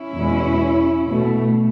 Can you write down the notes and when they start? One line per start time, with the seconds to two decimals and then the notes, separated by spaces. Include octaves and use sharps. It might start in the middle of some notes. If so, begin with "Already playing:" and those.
Already playing: C#4 E4
0.15 E2 B2 G#3
1.08 B2 A3